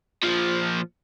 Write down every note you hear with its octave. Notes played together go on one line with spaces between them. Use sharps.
A#2 F3